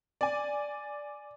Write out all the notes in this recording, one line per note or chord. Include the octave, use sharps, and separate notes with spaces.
D5 G#5